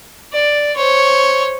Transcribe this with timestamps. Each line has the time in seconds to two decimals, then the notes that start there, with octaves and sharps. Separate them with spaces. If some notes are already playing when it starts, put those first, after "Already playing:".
0.33 D5
0.76 C5 C#5